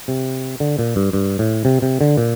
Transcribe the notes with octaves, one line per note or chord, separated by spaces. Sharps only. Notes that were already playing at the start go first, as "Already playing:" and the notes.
C3
D3
A#2
G2
G2
A2
C3
C3
D3
A#2